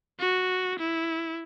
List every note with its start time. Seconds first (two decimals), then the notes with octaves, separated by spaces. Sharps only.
0.20 F#4
0.79 E4